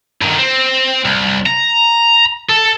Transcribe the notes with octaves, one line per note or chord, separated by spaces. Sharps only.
G2 D#3
C4
C2
A#5
A4